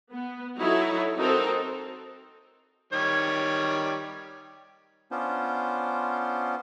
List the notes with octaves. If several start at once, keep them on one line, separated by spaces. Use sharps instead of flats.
B3
F#3 D#4 E4 A4 C#5
C4 D#4 F#4 A4 A#4 C5
D#3 G3 C#5
B3 C#4 D4 F4 C5